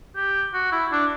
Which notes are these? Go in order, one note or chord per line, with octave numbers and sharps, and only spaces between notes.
G4
F#4
E4
D4